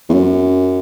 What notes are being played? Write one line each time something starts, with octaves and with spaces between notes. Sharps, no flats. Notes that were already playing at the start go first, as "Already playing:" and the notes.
E2
F#2